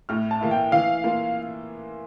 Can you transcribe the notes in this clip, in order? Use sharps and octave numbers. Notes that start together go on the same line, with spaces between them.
A2 F6
A5
E3 A#3 E4
G5
E3 F5
A#3 F4